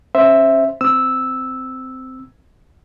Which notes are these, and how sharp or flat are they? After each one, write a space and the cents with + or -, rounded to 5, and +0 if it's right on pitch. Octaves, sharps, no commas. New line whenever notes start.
C#4 -30 C5 +0 E5 +0
C4 -15 E6 -5